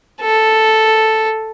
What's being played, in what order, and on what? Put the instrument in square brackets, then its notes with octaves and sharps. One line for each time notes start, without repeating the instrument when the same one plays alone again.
[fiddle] A4